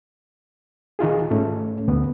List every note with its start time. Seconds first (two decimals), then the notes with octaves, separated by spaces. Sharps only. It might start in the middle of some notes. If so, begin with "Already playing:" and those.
0.99 D#3 D#4 F4 G#4
1.31 G#2 A3 C#4
1.88 D2 B3